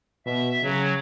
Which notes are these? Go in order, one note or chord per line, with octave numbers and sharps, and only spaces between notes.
B2 E5
C#3 F#3